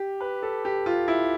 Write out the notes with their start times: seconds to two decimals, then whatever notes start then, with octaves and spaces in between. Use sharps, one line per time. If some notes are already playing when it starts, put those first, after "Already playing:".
Already playing: G4
0.20 B4
0.43 A4
0.65 G4
0.86 F4
1.08 E4